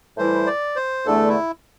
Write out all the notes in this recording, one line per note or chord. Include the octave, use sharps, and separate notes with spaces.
A2 E3 G3 E4 C5
D5
C5
E2 D3 A3 A4
E4